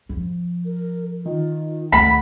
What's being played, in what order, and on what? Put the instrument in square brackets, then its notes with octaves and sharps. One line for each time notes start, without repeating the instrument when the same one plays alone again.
[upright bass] F3
[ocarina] A#4
[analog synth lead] D#3 [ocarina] F4
[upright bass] D2 [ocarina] F#5 [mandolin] B5